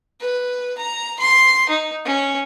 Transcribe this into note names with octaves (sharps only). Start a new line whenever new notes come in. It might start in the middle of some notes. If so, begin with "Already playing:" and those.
B4
A#5
C6
D#4
C#4